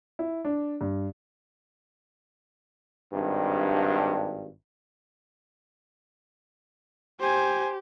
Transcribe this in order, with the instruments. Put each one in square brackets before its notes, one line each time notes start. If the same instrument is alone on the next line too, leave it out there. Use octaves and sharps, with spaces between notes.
[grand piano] E4
D4
G2
[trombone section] G#1 G2
[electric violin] G4 [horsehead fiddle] C5 G#5